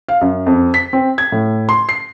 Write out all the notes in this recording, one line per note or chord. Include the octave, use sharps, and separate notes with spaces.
F5
F#2
F2
B6
C4
G#6
A2
C6
C7